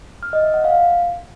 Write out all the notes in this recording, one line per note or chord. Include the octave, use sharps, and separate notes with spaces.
F6
D#5
E5
F#5
F5